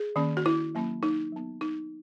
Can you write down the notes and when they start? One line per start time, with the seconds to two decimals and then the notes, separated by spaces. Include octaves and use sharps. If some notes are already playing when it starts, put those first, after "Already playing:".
Already playing: G#4
0.16 D#3 A#3 C#4
0.37 F#4
0.46 E4
0.75 F#3 A#3 C#4
1.03 D#4
1.32 F#3 B3
1.61 D#4